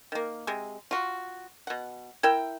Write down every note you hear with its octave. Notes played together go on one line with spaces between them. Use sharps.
D#3 A#3
C3 G#3
F4 F#4
B2 F#5
E4 A#4 E5 G5